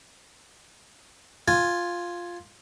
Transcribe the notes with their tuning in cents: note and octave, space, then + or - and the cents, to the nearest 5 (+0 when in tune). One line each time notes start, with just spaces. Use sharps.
F4 +0 G#5 +0